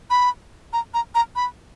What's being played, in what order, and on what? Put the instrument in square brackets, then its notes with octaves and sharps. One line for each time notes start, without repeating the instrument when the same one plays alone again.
[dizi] B5
A#5
A#5
A#5
B5